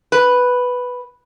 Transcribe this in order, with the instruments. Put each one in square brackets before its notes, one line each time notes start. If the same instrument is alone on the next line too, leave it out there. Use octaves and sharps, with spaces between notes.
[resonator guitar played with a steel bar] B4